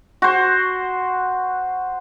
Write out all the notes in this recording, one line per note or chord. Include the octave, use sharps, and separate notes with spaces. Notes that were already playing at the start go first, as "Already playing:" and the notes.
F#4 C5